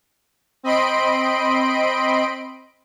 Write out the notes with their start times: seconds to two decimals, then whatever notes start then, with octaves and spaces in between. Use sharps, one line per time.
0.63 C4 D#5 B5 C6 D7